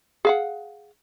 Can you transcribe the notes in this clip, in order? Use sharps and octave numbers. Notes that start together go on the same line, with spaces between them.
G#4 F5 F#5